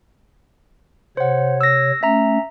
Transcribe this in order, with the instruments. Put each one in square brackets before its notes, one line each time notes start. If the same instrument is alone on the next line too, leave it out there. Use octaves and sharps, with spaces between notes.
[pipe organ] C3 C#5 [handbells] C5 F#5
[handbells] E6 A#6
[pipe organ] A3 C#4 [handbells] E5 A#5